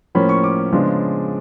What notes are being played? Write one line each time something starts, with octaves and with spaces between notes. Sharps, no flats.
A2 F3 A#3 C#4 B5
C#6
D6
C#3 F3 G#3 B3 D4